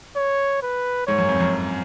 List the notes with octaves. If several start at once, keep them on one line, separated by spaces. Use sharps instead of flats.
C#5
B4
G#2 C#5
F#2
F2
F#2